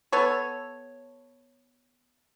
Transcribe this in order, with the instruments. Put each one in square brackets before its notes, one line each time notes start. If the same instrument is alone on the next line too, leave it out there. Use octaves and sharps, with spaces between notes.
[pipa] B3 A4 C#5